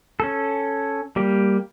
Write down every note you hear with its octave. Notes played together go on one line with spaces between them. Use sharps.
C#4 A4
G3 A#3 G4